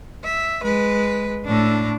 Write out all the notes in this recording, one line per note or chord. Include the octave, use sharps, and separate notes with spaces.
E5
G#3 B4
A2 D4